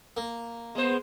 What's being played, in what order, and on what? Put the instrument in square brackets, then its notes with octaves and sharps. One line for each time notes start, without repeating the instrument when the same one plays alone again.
[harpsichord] A#3
[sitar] G#3 C5 [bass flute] B3